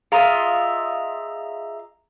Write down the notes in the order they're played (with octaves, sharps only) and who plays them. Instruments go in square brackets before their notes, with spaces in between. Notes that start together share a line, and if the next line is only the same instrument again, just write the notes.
[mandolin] F4 D#5 E5 [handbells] G#4 A#5